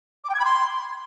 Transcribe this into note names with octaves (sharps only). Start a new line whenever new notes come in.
D6
G5
G#6
B5
C6